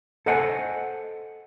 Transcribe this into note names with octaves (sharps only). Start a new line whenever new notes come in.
A4 C5 D#5 F#5 G#5 A5